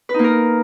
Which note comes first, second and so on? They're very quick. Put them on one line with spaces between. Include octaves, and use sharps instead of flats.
B4 D#4 A#3 A#4